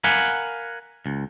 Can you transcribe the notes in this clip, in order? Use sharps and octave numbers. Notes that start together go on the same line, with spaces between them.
A#4 F5 F#5 G#5 B5
C#2